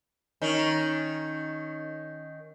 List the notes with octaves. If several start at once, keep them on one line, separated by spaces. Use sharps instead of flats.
D#3 C#4